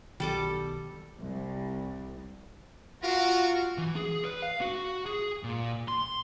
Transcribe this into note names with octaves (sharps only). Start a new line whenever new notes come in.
B1 B2 D#3 G3 A4 D6
C2
F4 F#4 A#4
E3
G#4
B4
F5
F#4
G#4
A#2
C6